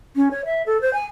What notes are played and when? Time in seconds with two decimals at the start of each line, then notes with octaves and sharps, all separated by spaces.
0.16 C#4
0.31 C#5
0.45 E5
0.66 A4
0.81 C5
0.93 G#5